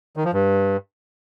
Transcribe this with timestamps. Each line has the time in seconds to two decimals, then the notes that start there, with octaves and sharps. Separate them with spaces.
0.17 D#3
0.25 F3
0.33 G2